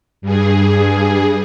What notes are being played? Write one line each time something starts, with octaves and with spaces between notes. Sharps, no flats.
G2 G#4